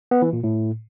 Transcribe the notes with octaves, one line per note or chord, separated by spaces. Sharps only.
B3
E3
A#2
A2